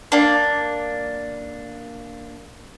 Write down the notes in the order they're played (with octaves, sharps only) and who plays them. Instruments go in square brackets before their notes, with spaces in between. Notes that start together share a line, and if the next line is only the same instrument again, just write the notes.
[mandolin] A#3 D4